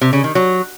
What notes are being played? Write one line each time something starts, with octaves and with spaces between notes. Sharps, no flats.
C3
C#3
D#3
F#3